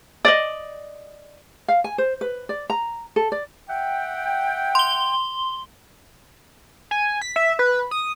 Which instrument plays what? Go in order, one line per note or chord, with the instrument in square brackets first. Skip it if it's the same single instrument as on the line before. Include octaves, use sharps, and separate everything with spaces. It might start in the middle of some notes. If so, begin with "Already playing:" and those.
[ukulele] D5 D#5
F5
G#5
C5
B4
D5
A#5
A4
D5
[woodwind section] E5 F#5 G5
[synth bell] C6 G7
[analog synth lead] G#5
B6
E5
B4
D#6